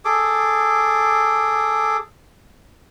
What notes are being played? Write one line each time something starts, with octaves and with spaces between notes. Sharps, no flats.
G#4 A4 D6